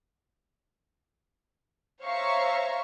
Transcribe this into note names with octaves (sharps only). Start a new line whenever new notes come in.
C5 C#5 E5 F5 A#5 C#6